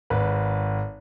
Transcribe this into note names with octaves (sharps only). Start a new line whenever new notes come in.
G#1 B4